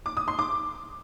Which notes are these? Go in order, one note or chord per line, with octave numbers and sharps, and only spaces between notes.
D6
D#6
C6
D6